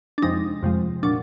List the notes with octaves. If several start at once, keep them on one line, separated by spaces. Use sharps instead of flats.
D4
F2 C3 F3 G#3 D#4
F2 C3 F3 G#3
A#2 F#3 D4